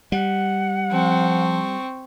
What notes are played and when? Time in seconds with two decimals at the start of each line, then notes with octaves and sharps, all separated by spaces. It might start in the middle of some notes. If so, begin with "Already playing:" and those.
0.12 G3 F#5
0.91 F3 C4 C#6